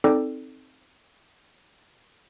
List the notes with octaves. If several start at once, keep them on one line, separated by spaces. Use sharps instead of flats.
C4 D#4 A4 D5 G5 D6